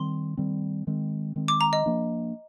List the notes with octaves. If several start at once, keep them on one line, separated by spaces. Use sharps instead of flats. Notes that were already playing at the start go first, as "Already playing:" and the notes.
Already playing: D#3 G3 C4 C6
D#3 G3 C4
D#3 G#3 C4
D#3 G#3 C4
D6
A#5
D#5
F3 A#3 D4